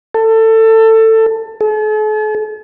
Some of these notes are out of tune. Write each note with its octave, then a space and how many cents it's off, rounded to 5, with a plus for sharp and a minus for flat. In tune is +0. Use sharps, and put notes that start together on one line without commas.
A4 +20
A4 -45